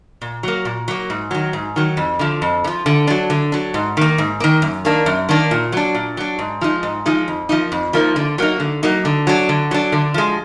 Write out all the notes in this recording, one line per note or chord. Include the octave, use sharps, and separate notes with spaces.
A#2
F#3 A#3
A#2
F#3 A#3
G#2
D#3 F#3
G#2
D#3 F#3
F2
D3 F3
F2
D3
F3
D3
F#3 D4
D3
F#3 D4
G#2
D#3 A#3
G#2
D#3 A#3
F#2
D#3 A#3 D4
F#2
D#3 A#3 D4
A#2
F#3 D4
A#2
F#3 D4
G#2
F3 G#3 D#4
G#2
F3 G#3 D#4
F2
F3 A#3 D#4
F2
F3 A#3 D#4
D3
F#3 A#3 D#4
D3
F#3 A#3 D#4
D3
F#3 D4
D3
F#3 D4
D3
F3 G#3